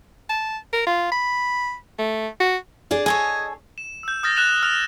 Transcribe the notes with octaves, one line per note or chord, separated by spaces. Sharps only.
A5
A#4
F4
B5
A3
F#4
D4 G#4 D5
G#4 A4 C#5 D#5 G#5
E7
E6 G6
D#6 F6 G6 A6 A#6
F#6 E7 F7
F6 F7